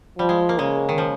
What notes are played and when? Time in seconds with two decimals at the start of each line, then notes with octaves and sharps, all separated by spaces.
0.19 F3 G3
0.29 G#3
0.49 A#3
0.59 C#3 G#3
0.89 D#3
0.98 F3